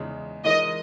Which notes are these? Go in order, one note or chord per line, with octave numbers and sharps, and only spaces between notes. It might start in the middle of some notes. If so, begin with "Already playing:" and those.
Already playing: E2 C#3 G#3 D#4
E3 G#3 D#4 A#4 D#5